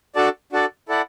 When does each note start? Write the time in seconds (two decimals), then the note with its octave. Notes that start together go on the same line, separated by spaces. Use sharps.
0.15 D4 F#4 A4 D5 A5
0.53 D4 F#4 A4 D5 A5
0.89 E4 A4 D5 F#5 A5